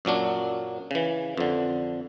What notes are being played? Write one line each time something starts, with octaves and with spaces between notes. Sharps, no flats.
F#2 A#2 F#3 D4
C#3 E3
F2 D3